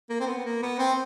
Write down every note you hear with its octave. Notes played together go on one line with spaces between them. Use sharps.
A#3
C4
B3
A#3
B3
C4